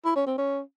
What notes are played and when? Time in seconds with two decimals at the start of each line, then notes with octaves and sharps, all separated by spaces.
0.05 E4
0.16 C#4
0.27 C4
0.38 C#4